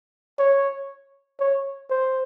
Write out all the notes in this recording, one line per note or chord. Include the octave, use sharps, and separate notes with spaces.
C#5
C#5
C5